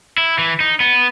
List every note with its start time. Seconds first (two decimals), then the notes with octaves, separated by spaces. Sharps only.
0.18 E4
0.38 E3
0.60 D#4
0.80 B3